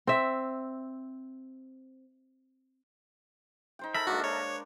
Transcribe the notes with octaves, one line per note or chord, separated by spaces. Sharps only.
C4 E5
D#4 C5 G5
A4 A#4 E5 B5
G#3 A#3 D4 F#4
C#5